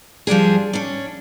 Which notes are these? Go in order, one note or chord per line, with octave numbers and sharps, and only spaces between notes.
F3 G3 D4 G#4
C#4 D4